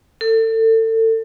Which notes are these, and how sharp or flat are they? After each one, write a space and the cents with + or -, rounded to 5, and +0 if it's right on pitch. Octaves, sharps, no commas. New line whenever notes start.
A4 +30